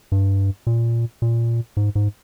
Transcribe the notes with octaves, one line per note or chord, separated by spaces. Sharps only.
G2
A#2
A#2
G#2
G#2